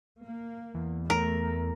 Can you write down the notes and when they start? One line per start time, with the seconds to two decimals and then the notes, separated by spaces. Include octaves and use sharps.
0.20 A#3
0.74 E2
1.10 A3 A#4